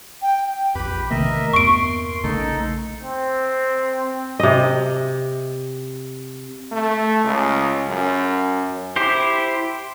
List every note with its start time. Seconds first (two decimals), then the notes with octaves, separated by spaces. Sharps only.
0.22 G5
0.75 A#1 F2 G4 B4 B5
1.11 C3 D#3 A3 A#3 A#4 D#5 E5
1.53 E2 G2 B3 C6 C#6 D7
2.24 A#1 C#3 A3 D#4 A4
3.03 C4
4.40 C3 D#5
6.72 A3
7.24 C#2
7.89 F#2
8.96 E4 G4 C5